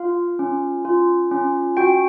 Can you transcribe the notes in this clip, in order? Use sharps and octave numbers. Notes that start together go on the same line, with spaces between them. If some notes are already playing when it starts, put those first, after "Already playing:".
Already playing: F4 F5
C#4
F4
C#4
F#4 G5